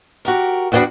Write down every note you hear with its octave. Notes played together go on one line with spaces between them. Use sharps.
F#4 G4 A#4
E2 G3 A#3 B3 D4 F#4